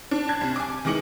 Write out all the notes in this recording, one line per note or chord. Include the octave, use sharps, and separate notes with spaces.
D4
A5 F#6 G#6
C2
G#5 D6
D#3 E3 G#3 D6 C#7 F#7